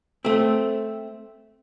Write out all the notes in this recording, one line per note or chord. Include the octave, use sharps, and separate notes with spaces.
A3 C4